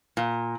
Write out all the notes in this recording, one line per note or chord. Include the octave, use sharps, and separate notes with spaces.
A#2